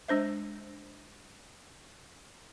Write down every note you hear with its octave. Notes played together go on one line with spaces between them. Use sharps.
G#3 D4 C5 E5